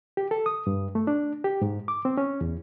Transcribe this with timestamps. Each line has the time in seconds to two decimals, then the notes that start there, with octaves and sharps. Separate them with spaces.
0.17 G4
0.31 A4
0.46 D#6
0.67 G2
0.95 A3
1.07 D4
1.44 G4
1.62 G#2
1.88 D6
2.05 C4
2.18 C#4
2.41 E2